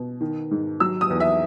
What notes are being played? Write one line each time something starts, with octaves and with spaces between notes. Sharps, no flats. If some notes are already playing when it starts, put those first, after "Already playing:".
Already playing: B2
D#3
G#2
F#3 E6
D#6
E2
E5